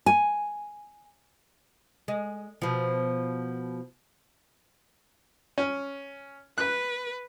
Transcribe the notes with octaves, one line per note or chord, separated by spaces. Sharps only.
G#5
G#3
B2 F3
C#4
B4 F#6